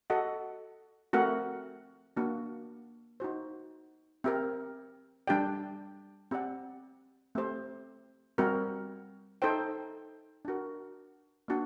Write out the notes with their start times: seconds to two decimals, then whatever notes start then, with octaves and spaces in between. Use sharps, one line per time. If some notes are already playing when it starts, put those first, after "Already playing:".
0.10 F#4 A4 D#5 F#5
1.13 A3 C4 F#4 A#4 F#5
2.17 A#3 D4 F#4
3.20 D#4 F#4 C5
4.24 C4 G4 A#4
5.27 G3 D4 G4 D5 G5
6.31 C4 G4 D5 F#5
7.35 A3 C4 G4 C5
8.38 G3 C4 F#4 A#4
9.42 D#4 A4 C5 G5
10.45 D4 F#4 A#4
11.48 A#3 D4 F#4